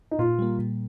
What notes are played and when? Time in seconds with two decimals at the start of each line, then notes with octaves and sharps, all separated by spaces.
0.11 D#4
0.19 A#2 F4
0.39 G3 A#3
0.59 A#2